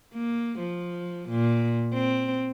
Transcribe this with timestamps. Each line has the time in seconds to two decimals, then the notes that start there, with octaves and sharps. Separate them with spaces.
0.14 A#3
0.59 F3
1.29 A#2
1.93 C4